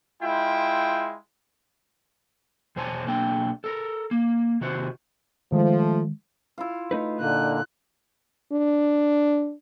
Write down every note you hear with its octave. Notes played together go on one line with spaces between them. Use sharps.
G#3 E4 F4 G5
E2 B2 C5 C#5 G#5 A5
B1 A#3 D4 G5
A4 A#4
A#3
C3 D#3 F#4 C5
D#3 F3 G#3 A3
E4 F4 F5
A3 D#4 B4
A#2 D3 A#3 D#4 F#6
D4